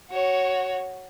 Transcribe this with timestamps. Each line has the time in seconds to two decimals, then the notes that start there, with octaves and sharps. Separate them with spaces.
0.11 F#4 C#5